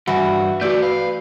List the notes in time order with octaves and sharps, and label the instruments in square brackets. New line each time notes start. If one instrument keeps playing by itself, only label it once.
[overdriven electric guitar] G2 [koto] E3 [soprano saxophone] F#4
[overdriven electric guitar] A3 B4 [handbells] F#4 E6 G6 [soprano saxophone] D5
[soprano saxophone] B4 [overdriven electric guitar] F5